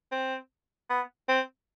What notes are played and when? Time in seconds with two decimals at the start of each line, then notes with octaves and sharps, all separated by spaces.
0.12 C4
0.90 B3
1.29 C4